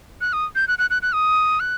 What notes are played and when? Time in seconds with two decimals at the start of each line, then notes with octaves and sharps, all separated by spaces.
0.21 F#6
0.33 D#6
0.55 G6
0.68 F#6
0.79 F#6
0.90 F#6
1.02 F#6
1.14 D#6
1.60 F#6